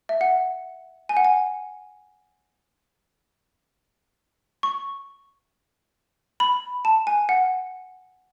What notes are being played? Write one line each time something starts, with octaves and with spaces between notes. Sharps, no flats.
E5
F#5
G#5
F#5
G#5
C#6
B5
A5
G#5
F#5